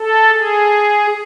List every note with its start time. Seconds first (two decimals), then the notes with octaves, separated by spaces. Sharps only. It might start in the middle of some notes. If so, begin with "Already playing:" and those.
Already playing: A4
0.30 G#4